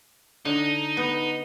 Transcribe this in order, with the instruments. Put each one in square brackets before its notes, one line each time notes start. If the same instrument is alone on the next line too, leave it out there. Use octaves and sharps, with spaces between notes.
[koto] D3 [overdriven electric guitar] D#4
[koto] B3